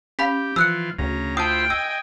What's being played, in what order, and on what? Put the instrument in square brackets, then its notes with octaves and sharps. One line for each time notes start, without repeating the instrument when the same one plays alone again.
[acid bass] C#4 [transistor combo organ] G4 [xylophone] F5 B5 B6
[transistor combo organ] E3 F4 [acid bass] F3 [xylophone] E6 F#6 C#7
[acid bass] D2 [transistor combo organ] C#3 A#5
[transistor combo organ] E4 F4 C5 [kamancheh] G5 [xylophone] A5 D#6
[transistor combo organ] D#5 G#5 [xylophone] E6